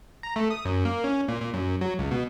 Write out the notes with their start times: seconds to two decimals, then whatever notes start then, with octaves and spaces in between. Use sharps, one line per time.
0.23 A#5
0.36 A3
0.50 D#6
0.65 F#2
0.85 A#3
1.04 C#4
1.28 A#2
1.41 A#2
1.54 F#2
1.81 F#3
1.99 C#2
2.11 B2